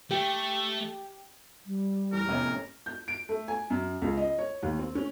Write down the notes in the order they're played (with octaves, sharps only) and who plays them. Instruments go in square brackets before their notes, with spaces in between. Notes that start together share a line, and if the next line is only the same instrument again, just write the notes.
[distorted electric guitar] A3 [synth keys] G4 G5
[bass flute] G3
[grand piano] E2 A2 [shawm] A#4
[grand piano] F1 A2 [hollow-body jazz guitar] C3 C#4 [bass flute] B3
[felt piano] G6
D7
A3
G#5
F#2
C#2
D#5
C#5
D#2
C4
C#4